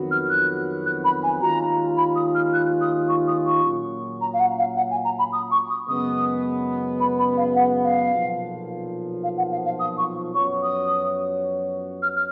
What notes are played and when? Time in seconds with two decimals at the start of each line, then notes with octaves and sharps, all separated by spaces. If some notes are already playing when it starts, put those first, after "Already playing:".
Already playing: F2 D#3 F#3 B3 F#4
0.11 F6
0.30 F#6
0.86 F#6
1.04 B5
1.23 G#5
1.41 D#2 D#3 G#3 C#4 F4 A#5
1.97 B5
2.16 D#6
2.35 F6
2.53 F#6
2.81 D#6
3.09 C#6
3.27 D#6
3.46 C#6
3.65 A#2 F#3 C#4
4.21 A#5
4.33 F5
4.39 F#5
4.58 F5
4.77 F#5
4.90 G#5
5.04 A#5
5.18 B5
5.32 D#6
5.51 C#6
5.70 D#6
5.88 F#2 C#3 G#3 B3 D#6
7.00 B5
7.18 B5
7.37 F5
7.55 F#5
7.83 F5
8.11 B1 A#2 F3
9.23 F5
9.37 F#5
9.51 F5
9.65 F5
9.79 D#6
9.98 C#6
10.34 F#2 F3 B3 F#4 C#5 C#6
10.63 D#6
12.02 F6
12.16 F6